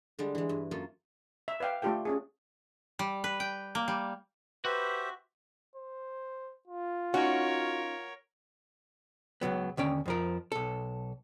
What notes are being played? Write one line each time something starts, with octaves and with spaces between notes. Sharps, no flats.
D3 G3 G#3 D4
E3 G#3
G2
F#2 A#3 F4 A4
E5
B4 D5 F5 G5
A3 D4 F4 G4 A4 G5
C#4 D4 G#4
G3
B4
G5
A#3
G3
F#4 G4 B4 C5 E5
C5
F4
C#4 D#4 F#4 A#4 C#5
C#2 F#2 F#3 B3
D#2 D3 C#4 G5
F2 F3 A#4
B1 A4